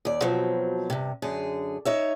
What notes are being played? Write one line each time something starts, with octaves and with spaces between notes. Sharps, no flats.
D#2 D5
B2 F3 F#3 C4
G2 C3
F#2 D3 G#4
D#4 C#5 E5